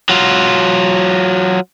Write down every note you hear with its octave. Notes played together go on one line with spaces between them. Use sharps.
F#3 F4